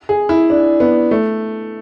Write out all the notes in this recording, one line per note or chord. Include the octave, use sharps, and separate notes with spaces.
G#4
E4
D4
B3
A3